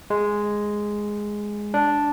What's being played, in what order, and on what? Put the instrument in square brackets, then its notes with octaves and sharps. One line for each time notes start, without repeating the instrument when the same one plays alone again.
[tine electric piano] G#3
D4